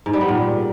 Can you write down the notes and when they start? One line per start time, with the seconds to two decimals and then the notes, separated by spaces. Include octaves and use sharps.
0.06 G#2
0.13 G3
0.21 B3
0.28 A#2